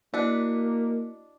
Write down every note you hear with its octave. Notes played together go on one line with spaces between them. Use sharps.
A#3 D4 E4 F#4 D#5